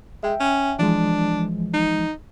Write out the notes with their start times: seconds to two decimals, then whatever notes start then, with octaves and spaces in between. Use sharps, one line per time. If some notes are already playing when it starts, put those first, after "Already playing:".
0.23 G#3 E5 G5
0.40 C#4
0.79 E3 F3 G#3 D4
1.74 D#4